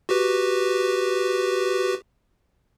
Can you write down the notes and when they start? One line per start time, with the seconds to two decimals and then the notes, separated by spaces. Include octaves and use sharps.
0.09 F#4 G4 B4